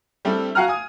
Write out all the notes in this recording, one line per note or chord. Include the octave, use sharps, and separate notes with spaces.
G3 A3 C4 D4 E4
F#4 F5 F#5 G#5 A#5 F6
G#5 D#6